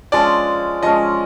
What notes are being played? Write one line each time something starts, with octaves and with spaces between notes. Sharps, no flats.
F3 G#3 C#4 D5
F3 G#3 C#4 D#5